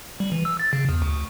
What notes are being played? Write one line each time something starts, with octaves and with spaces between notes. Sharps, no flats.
G3
E3
E6
A6
C#3
E2
D2